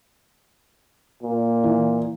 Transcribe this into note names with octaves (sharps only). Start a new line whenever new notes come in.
A#2
E3